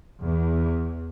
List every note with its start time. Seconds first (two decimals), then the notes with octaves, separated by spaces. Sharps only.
0.22 E2